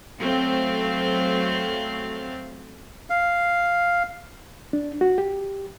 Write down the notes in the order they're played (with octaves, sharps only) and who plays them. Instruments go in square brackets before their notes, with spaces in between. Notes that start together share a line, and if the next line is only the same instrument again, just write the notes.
[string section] F#3 A3 C4 F5
[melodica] F5
[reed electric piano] D4
F#4
G4